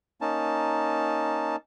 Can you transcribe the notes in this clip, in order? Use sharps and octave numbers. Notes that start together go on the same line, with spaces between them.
A#3 C#4 D#4 A5